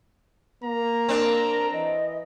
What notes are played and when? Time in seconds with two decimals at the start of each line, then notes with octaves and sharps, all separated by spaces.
0.64 A#3 A#5
1.08 C4 D4 A#4
1.73 E3 D#5